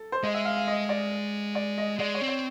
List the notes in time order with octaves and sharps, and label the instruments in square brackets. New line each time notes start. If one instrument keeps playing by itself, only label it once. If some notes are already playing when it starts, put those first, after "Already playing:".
Already playing: [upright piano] A4
C5
[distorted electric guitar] G#3 [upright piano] D#5
[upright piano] E5
F5
F5
D#5
D5
D5
D#5
[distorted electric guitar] G#3 [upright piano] D5
[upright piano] C#5
[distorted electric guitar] C4
[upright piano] C#5